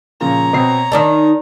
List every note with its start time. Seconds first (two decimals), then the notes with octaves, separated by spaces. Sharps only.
0.21 A#2 C#3 F3 C#5 A#5
0.53 B2 C4 C7
0.92 D#3 D4 D#4 A5